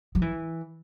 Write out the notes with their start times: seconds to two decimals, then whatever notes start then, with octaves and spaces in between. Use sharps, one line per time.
0.15 F#3
0.22 E3